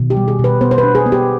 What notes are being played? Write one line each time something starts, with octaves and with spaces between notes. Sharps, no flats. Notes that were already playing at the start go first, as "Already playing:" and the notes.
Already playing: B2 D#3
G4
G3
G#4
B2
B4
B3 C5
C5
B4
D4
G#4
B3
G4